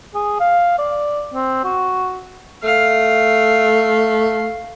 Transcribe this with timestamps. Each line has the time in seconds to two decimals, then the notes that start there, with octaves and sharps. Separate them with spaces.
0.14 G#4
0.40 F5
0.78 D5
1.34 C4
1.64 F#4
2.63 A3 F5